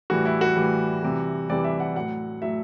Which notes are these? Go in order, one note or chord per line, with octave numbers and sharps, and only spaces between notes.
A2 E3 G3 F#4
E4
F#4
A2 E3 G3
C3 E3 G3
C3 E3 G3 D5
E5
F#5
A2 F#3 F#5
A2 F#3 E5